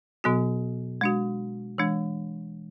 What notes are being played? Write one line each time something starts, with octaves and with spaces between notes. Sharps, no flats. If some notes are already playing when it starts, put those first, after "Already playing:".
B2 F#3 B3 F#4
G#3 D4 F#4
E3 G#3 D4